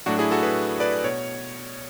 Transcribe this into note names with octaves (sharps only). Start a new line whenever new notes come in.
A2 F#3 A3 D4 F#4
E4 G#4
F#4 A4
G#4 B4
B4 D5
B2 C#5